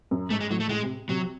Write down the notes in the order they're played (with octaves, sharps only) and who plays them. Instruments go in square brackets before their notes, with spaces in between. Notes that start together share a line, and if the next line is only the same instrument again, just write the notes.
[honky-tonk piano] F#2
[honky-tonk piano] G#2 [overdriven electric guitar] A3
[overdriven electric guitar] G#3
[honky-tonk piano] A2 [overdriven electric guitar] F#3
[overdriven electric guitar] A3
[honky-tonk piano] A2 [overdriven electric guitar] G#3
[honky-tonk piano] C3
[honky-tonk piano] C3 [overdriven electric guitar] F#3